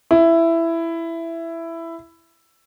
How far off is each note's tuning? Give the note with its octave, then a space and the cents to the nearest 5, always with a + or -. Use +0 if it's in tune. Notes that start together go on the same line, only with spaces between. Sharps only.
E4 +10